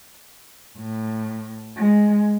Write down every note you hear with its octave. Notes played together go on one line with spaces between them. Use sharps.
A2
G#3